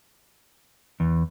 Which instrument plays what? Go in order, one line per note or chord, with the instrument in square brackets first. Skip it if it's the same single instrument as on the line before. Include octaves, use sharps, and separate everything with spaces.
[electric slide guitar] E2